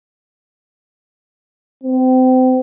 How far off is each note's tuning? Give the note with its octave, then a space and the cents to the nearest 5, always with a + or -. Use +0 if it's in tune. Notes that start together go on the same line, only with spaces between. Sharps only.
C4 -30